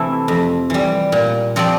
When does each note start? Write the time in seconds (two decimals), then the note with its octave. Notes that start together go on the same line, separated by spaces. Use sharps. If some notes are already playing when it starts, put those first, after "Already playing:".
Already playing: C3 E3 A3 E4
0.28 F2
0.70 E3 G3
1.12 A#2
1.56 F3 C4 G4 D5